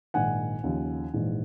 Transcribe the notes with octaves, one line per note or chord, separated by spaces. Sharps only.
A#1 G#2 D#3 F#5 G#5
D#2 C#3 F3
A#1 G#2 E3